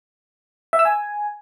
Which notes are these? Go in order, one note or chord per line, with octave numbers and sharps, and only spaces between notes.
E5
E6
G#5